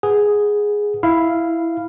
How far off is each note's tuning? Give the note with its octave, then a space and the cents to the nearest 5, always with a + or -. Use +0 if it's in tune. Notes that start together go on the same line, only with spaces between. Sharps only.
G#4 +0 B4 +0 F#5 +0
E4 +0 F5 -10